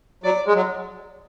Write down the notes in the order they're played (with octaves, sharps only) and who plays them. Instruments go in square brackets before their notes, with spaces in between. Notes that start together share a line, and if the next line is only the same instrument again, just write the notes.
[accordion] F#3 [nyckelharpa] D5
[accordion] G#3
F#3